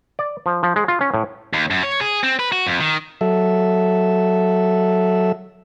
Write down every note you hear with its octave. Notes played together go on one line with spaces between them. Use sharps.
D5
F3
F3
G#3
F4
C#4
A2
D#2
F#2
C#5
G#4
C4
B4
F#4
F2
D#3
F#3 A4 E5